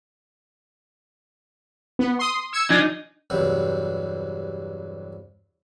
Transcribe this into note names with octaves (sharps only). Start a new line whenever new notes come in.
B3
C6 D#6
E6 G#6 C#7
F3 D4 D#4 G#5
E2 G2 C3 F#3